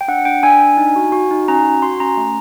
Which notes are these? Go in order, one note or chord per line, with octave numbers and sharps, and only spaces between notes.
G5
D4 F#5
D4 G5
D4 G#5
D4
D#4
F#4
F#4
D#4
C#4 A#5
F#4
F#4 C6
C#4 A#5
A3